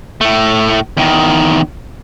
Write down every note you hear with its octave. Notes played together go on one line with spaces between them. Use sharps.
A2 A3
E2 D#3